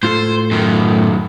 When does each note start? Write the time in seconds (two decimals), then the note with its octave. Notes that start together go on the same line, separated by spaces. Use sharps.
0.03 A2 F4 A4 C5
0.51 F#2 D#3